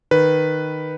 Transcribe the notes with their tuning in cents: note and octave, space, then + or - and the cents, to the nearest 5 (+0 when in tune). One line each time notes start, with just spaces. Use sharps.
D#3 -10 B4 +0